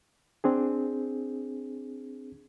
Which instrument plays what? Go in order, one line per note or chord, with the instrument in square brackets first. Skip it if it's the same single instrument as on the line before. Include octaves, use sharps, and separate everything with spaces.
[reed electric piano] C4 D4 G#4